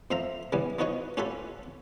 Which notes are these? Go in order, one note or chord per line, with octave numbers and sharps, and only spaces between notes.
F2 C5 E5 F5 A#5
C#3 E3 G3 B3
F3 B3 D#4 F#4 C#5 D#5
C#4 F4 G4 A4 F#5 B5